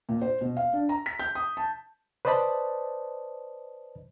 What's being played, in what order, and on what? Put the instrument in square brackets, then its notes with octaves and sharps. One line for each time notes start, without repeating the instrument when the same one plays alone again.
[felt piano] A#2
C5
B2
F5
D4
A#5
B6
G6
D#6
A5
[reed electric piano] B4 C5 D5 D#5 A5 B5